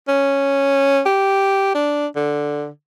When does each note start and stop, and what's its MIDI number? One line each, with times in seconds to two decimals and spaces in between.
0.08 1.00 61
1.06 1.72 67
1.74 2.07 62
2.16 2.68 50